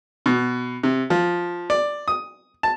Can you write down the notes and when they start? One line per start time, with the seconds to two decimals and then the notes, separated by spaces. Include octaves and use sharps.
0.26 B2
0.83 C3
1.10 F3
1.70 D5
2.08 D#6
2.63 A5